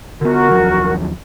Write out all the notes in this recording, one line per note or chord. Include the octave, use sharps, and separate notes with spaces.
D3 B3 F#4 A#4
D#2 F3 F#3